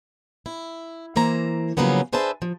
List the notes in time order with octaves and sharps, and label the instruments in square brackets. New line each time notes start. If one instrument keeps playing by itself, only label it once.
[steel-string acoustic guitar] E4
E3 A#3 C5 A#5
C#3 F3 F#3 A#3 B3 C#4
D4 G#4 B4 C5 E5 A5
F3